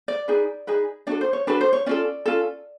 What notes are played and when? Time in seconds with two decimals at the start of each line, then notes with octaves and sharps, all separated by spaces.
0.08 D5
0.28 D#4 G#4 B4
0.67 D#4 G#4 B4
1.07 D4 F#4 A4 D5
1.21 C5
1.33 C#5
1.47 D4 F#4 A4 B4
1.61 C5
1.73 C#5
1.86 C#4 F4 A4 D5
2.26 C#4 F4 A4